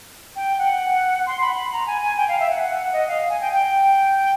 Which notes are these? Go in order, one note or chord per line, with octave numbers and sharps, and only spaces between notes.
G5
F#5
C6
B5
B5
A#5
G#5
G#5
G5
F5
E5
F#5
F#5
F#5
D#5
F5
G#5
G5
G5